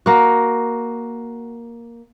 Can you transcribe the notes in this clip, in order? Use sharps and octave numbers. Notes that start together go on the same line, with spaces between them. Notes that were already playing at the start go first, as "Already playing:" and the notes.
A#3 F#4